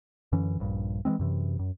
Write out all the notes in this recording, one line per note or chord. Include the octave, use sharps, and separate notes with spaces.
F#2 D3 E3 C#4
D#1 A#1 G2
E3 G3 G#3 C4
F#2 C3 E3
F#2